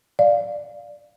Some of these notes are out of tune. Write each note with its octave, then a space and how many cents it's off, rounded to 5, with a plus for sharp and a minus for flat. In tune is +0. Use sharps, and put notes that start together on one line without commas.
D5 +0 F5 +0